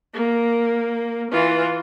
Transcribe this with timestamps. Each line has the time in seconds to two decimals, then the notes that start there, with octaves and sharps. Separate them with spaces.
0.14 A#3
1.32 E3 F4